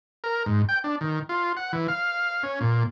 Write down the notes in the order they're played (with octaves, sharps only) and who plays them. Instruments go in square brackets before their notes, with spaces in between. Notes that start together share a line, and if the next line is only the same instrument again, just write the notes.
[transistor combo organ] A#4
G#2
G5
D4
D#3
F4
F#5
E3
F5
C#4
A#2